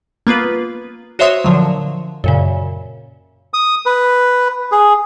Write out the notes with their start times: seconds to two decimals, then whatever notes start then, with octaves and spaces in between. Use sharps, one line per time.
0.27 A#3 B3 F4 B4
1.19 F#4 C5 C#5 E5 C6 D#6
1.44 A#2 D3 F3 F#3
2.24 F#2 A#2 C#3
3.54 D#6
3.86 B4
4.72 G#4